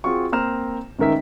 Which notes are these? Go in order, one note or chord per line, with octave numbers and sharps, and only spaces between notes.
C4 F4 F#4 G#4 C#6
A#3 C4 C5 A#5 F6 E7
A1 G#2 D#3 A#4 E5 B6